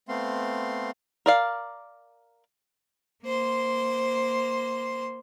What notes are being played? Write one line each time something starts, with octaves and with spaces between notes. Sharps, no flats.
A3 B3 C4 F5 C6
A#4 D5 F5
A#3 C5 C6